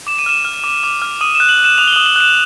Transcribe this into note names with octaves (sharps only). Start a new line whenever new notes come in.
D6 E7
D#7
F6 E7
F6
D6
D6
F6
D#6 D#7
E7
F#6
F#7
F#6
E7
D#6 F7
G7
D#6 F#7
F#7
F#6 E7